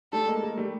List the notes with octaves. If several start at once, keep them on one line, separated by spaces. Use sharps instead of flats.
G3 A3 A4
G#3 A#3
G#3 A#3
G3 A3